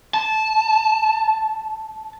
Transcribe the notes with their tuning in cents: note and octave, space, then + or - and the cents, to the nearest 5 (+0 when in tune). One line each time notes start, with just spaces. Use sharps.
A5 -15